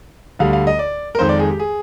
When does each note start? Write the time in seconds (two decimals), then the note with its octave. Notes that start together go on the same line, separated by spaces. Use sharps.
0.39 D2 D3 G3 F5
0.53 F5
0.67 D#5
0.79 D5
1.15 A#4
1.19 F2 D#3 G#3 C5
1.29 D5
1.39 G#4
1.50 G4
1.59 G#4